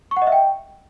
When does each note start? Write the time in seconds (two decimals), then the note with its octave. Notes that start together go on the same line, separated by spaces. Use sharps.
0.11 C#6
0.17 F#5
0.22 D#5
0.27 E5
0.32 G5